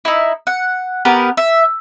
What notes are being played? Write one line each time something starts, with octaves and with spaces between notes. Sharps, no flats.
D#4 E4
F#5
B3 G4 A#4 B4
E5